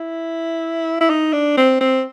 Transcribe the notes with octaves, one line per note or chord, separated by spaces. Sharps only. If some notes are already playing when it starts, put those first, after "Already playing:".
Already playing: E4
E4
D#4
D4
C4
C4